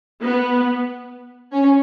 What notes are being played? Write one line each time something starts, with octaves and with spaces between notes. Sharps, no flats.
B3
C#4